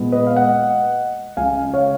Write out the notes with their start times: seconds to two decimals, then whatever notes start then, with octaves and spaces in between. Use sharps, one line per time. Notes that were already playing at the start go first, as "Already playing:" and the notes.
Already playing: A#2 G#3 B3
0.12 B4 D#5
0.27 F5
0.37 D#5 F#5
1.37 C#2 C#3 G#3 F5 G#5
1.74 C#5 F5